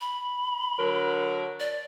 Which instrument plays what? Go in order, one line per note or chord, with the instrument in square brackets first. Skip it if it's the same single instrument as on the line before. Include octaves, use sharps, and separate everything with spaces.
[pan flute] B5
[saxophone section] D3 F#3 A#4
[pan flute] D5